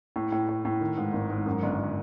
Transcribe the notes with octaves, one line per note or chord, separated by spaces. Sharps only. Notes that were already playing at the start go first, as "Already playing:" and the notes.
A2
A2
A2
A2
D#3
G#2
G#1
G#2
F#2
G1